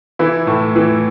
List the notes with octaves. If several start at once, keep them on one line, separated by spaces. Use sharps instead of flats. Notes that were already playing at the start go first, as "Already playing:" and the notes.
E3 E4
A2
E3